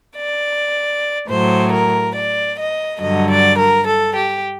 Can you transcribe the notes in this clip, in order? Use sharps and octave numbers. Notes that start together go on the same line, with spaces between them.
D5
A2 F#3 C5
A#4
D5
D#5
G2 D3 F#3 D#5
D5
A#4
A4
G4